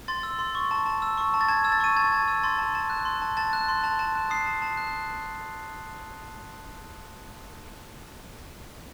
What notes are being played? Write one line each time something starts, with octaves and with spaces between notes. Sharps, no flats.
C6 A6
E6
C6
C#6
A5
A5
E6
C#6
A5
A6
A5 G#6
E6
A6
C#6 D#7
A5 G#6
A5
E6
C6 A6
A5
A5
F#6
C6
A5
A5 A6
F#6
C6
A5
A5
F#6
D#6 C7
A5
A5
F#6